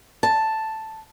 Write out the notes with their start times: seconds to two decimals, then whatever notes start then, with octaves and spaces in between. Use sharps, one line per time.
0.23 A5